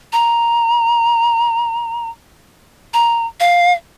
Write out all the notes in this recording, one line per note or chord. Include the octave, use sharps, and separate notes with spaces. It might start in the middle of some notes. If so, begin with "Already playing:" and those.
A#5
A#5
F5